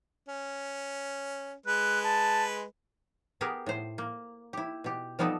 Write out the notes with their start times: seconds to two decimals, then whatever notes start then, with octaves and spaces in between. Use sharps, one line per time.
0.28 C#4
1.66 G#3 B4 F#6
2.03 A5
3.41 B3 G4 G#4 A#4
3.66 A2 C5
3.98 A#3
4.53 E4 G4
4.84 B2 G4
5.19 F3 G3 B3 C4 D#4 A4